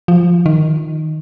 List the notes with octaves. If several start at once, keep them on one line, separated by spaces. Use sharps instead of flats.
F3
D#3